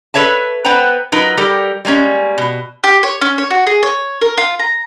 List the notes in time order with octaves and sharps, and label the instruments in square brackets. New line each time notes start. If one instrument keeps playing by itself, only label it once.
[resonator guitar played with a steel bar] A4 B4 C#5 E5 A5
B3 B4 C5 F#5 G5 A#5
F#3 D#4 F4 A#4 B4
G3 G4 A4 A#4
G3 G#3 A#3 C#4
B2
[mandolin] G4
C#5
C#4
C#5
F#4
G#4
C#5
A#4
F4
A#5